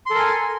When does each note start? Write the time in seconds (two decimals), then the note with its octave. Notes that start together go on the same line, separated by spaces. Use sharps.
0.06 C6
0.10 A4
0.15 A#4
0.19 G#5